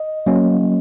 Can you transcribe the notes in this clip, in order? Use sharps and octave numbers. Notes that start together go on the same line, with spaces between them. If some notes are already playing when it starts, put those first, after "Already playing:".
Already playing: D#5
F#3 A#3 C#4